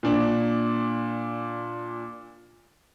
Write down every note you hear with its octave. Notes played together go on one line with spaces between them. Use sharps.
A#2 D4